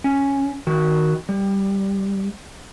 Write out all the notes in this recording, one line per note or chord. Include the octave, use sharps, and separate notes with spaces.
C#4
D#3 F#4
G3